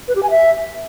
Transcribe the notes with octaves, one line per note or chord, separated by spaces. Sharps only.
B4
G4
G#5
E5